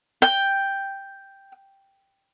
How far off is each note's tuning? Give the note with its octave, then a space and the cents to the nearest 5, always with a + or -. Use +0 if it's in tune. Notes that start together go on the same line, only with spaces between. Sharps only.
G5 +0